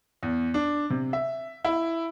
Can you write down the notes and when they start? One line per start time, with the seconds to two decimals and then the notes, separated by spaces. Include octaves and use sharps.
0.23 E2
0.54 D4
0.90 C3
1.13 E5
1.65 E4